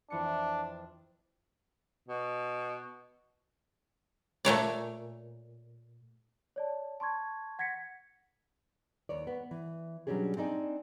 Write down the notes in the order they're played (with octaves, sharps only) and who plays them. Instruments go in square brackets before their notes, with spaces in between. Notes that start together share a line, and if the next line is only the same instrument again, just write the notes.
[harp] F2 E3 C#7 [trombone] D4
[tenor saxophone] B2
[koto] A#2 A3 C#5 D5
[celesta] C#5 D5 A5
A5 C6 C#6 G#6
F#5 G#6 A#6 B6 C#7
[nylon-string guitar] D#2 C#5 D5
B3
E3
B2 F#3 G3 C#4 D4 G#4
C4 D4 D#4 D5 G#5